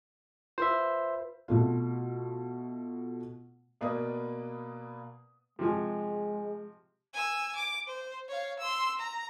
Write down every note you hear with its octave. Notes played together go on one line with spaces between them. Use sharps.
F4 B4 C5 E5
B2 A3 F4
B2 A#3 B4 D5 D#6
C3 F3 G#3 G#5
G#5 E6
D6
C5
C#5 F5
C6 E6
A#5